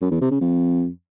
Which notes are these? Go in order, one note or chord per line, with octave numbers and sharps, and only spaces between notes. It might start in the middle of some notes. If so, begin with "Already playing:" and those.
F#2
E2
C3
C#3
F2